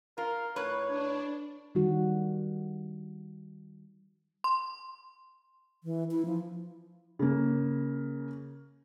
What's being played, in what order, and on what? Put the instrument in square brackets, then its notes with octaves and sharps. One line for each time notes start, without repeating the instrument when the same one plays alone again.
[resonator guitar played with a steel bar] F4 [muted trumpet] A#4
[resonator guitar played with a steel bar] A2 B4 [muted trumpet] C#5
[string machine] D4
[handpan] D#3 G3 F#4
[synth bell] C6
[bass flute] E3
E4
F3
[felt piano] C#3 A#3